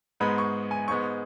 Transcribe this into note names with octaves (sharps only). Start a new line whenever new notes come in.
G#2 G#3 B3 B5
C#6
G#5
G#2 G#3 B3 C#6